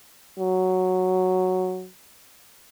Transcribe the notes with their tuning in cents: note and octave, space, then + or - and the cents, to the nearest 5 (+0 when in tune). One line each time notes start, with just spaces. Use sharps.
F#3 +0